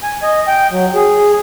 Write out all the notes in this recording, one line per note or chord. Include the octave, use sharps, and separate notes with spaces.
G#5
D#5
G5
F#3
G#4